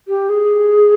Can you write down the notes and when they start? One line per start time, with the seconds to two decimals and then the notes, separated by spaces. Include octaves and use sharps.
0.08 G4
0.29 G#4